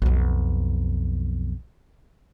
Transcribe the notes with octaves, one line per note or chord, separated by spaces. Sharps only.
B1 F2